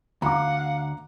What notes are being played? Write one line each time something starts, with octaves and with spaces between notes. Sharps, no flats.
D2 F5 F#5 A#5 D6